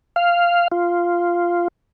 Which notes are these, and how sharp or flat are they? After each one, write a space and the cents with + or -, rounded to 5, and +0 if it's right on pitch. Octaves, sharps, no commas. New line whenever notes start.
F5 -5
F4 -5